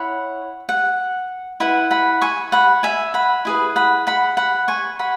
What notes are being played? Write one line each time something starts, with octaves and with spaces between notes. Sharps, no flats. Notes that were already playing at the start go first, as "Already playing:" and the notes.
Already playing: E4 C#5 F#5 B5
F#5
E4 B4 F#5
F#5 B5
G#5 C#6
F#5 B5
E5 G#5
F#5 B5
E4 G#4 B4
F#5 B5
F#5 B5
F#5 B5
G#5 C#6
F#5 B5